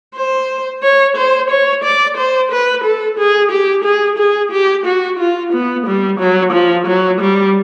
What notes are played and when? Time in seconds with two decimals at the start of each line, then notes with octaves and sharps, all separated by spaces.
0.15 C5
0.83 C#5
1.16 C5
1.50 C#5
1.84 D5
2.17 C5
2.51 B4
2.84 A4
3.18 G#4
3.51 G4
3.84 G#4
4.18 G#4
4.51 G4
4.85 F#4
5.19 F4
5.53 B3
5.86 G3
6.19 F#3
6.52 F3
6.87 F#3
7.21 G3